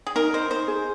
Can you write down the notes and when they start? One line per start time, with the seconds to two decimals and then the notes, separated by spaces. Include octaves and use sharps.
0.07 G#4
0.16 D#4 A#4
0.34 C5 D#5
0.51 D#4 C5
0.68 G#4